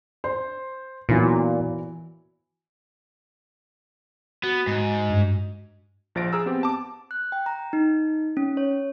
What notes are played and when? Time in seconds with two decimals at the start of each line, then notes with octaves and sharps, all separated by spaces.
0.24 C5
1.09 A#2 E3 F#3 B3
4.43 B3 F#4
4.67 G#2
5.10 G2
6.15 A#1 F3 A6 A#6 D7
6.32 G#4 A#5 E6 F6
6.46 B3 C4 G4
6.63 A5 D6
7.11 F#6
7.32 G5
7.46 A#5
7.73 D#4
8.37 C#4
8.57 C#5